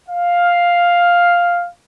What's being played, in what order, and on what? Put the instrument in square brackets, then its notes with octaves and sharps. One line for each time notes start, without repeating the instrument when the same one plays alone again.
[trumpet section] F5